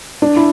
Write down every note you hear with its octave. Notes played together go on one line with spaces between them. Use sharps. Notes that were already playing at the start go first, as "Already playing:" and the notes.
D4
E4